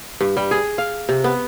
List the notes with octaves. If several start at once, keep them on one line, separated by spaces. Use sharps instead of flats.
G2
G3
G#4
F5
C3
B3